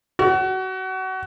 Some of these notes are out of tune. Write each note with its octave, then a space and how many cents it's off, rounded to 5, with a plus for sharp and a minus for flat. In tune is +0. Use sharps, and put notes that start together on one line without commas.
F#4 +25